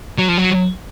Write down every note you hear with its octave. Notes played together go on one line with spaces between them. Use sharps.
F#3
F3
F#3